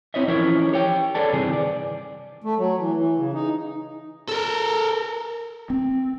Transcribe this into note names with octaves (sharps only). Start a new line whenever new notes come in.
C4 E4 C#5 D#5 E5
E3 F3 C#4 E4 A#4 C#5
G4 C#5 G5
G#4 A4 B4 D5 A5
G2 C3 D#3 E3 G#4
D5
A3
F#3
E3
E3
C#3
D#4
A4 A#4
C4